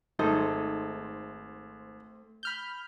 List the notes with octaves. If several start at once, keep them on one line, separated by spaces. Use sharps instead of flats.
G#1 A3 D#4 G#4 A4 C5
B5 F6 G6